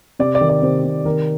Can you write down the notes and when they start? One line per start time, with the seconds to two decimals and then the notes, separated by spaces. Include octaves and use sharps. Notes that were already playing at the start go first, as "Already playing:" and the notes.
0.19 C3 D5
0.35 D5
0.41 D#3
0.49 D5
0.62 C3 C5
0.84 C3
1.05 D#3 A#4